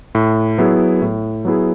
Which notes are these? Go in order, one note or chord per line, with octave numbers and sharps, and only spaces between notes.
A2
F#3 B3 E4 G#4
A2
F#3 B3 E4 G#4